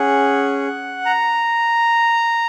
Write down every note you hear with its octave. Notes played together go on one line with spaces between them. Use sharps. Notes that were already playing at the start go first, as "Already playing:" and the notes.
Already playing: C#4 G#4 F#5
A#5